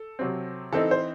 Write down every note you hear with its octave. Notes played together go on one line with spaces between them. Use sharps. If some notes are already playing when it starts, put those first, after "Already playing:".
Already playing: A4
C3 F#3 C4
E3 C4 D#4 A4
C5